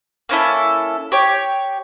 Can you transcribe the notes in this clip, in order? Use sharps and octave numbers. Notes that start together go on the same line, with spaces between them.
A#3 C#4 E4 A4
G4 C#5 G5